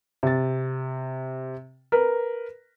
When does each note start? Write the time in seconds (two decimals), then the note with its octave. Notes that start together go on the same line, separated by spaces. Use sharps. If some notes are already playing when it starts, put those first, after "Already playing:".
0.23 C3 A6
1.92 A#4 B4